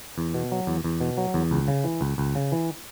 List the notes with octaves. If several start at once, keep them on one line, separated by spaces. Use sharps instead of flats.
E2
B2
F#3
E2
E2
B2
F#3
E2
C#2
C#3
E3
C#2
C#2
C#3
E3